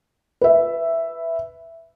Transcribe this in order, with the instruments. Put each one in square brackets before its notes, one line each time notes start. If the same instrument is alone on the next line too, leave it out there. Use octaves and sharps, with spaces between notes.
[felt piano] B4 E5